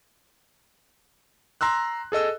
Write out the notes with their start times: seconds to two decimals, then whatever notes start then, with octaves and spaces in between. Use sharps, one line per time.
1.61 A#5 C6 E6 F#6
2.12 G#4 A4 D#5 E6